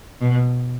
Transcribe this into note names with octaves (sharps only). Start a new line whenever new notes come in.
B2